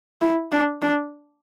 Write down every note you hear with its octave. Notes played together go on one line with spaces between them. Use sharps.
E4
D4
D4